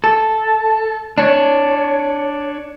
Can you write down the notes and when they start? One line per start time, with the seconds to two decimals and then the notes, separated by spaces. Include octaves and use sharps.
0.04 A4
1.18 D4 C#5